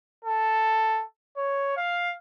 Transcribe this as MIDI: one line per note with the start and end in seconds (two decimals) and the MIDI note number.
0.25 1.03 69
1.37 1.72 73
1.77 2.12 77